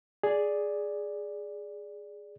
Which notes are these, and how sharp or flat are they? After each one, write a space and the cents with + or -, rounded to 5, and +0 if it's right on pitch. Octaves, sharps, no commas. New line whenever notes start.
G#4 +0 D5 +0